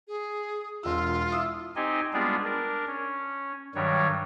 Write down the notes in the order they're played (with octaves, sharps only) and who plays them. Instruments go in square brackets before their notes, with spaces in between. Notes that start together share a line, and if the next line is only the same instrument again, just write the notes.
[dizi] G#4
[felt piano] E1 E6 [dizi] F4
[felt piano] E4 D#6 E6
[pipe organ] C4 D#4 G4 D#5 G#5
G3 G#3 B3 D4 F4 G#4
D4 A#4
C#4
G2 D#3 F#3 G3 C#5